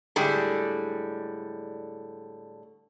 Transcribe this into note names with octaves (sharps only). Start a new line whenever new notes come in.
A2 D3 G3 G#3